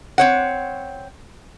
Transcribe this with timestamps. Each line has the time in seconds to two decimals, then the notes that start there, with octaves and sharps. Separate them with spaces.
0.18 C4 C#5 F#5